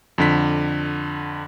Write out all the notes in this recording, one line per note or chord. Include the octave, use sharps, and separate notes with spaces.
F2 D3 B6